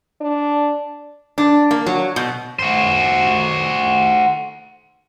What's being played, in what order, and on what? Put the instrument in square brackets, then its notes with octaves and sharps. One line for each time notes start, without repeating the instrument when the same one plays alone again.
[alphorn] D4
[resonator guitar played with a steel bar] D4
A#3
F#3
B2
[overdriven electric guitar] F#4 C5